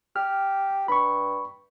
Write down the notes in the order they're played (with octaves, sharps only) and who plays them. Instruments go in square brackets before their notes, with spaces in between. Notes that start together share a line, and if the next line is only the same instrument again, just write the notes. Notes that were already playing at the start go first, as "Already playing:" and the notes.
[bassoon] G4 [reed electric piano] F6
[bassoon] G2 [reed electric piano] B5 C#6